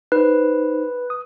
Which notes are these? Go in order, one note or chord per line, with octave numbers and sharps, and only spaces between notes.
D#4 B4 C5
D#6